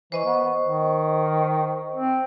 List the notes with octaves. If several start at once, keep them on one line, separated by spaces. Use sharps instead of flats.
E3 C5 D#5 C#6
B3
D#3
C4